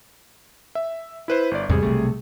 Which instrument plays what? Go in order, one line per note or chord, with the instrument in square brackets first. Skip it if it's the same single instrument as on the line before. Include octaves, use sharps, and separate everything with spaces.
[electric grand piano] E5
E4 B4 C5
G1 D5
[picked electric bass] E2 G#2 C3 [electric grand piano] G3 G#4
[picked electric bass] B1 C3 A3